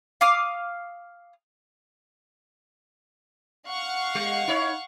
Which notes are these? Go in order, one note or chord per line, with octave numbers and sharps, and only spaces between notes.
F5 D6 D#6 F6
F5 F#5 C#6
G3
D#4 C#5